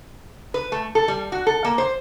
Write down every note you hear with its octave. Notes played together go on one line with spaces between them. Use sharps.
B4
A3
A4
G3
F#4
A4
A#3
C5